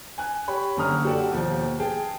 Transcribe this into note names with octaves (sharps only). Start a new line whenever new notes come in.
G#5 F#6
G4 C#5 B5
F#1 D3 C#4 A#5 D#6 F6
F#4 G4 A4 D5 F#5
D#2 B2 F3
G#4 G5 A5